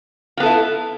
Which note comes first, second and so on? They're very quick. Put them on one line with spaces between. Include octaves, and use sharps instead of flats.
F4 B3 A4 E4